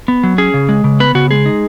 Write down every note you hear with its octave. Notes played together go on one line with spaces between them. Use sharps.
B3
F#3
C#4 G#4
C#3
G#3
C#3
B3 B4
C#3 F#4
G#3 G#4
D#4